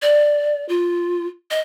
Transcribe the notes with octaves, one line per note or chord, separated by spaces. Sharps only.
D5
F4
D#5